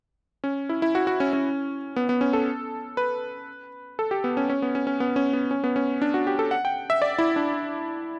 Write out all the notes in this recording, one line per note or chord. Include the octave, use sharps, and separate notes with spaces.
C#4
E4
E4
F#4
F#4
C#4
C#4
B3
B3
C#4
A4
B4
A4
G4
B3
C#4
C#4
B3
C#4
C#4
B3
C#4
B3
C#4
B3
C#4
D4
F#4
G4
A4
F#5
G5
E5
D5
E4
D4